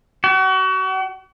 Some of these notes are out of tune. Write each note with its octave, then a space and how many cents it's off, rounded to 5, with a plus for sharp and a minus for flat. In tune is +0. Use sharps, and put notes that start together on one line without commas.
F#4 +35